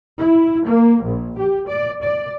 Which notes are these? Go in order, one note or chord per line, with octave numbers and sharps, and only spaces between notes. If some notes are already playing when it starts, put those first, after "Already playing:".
E4
A#3
A#1
G4
D5
D5